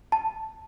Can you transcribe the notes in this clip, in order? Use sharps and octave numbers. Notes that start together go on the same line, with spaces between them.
A5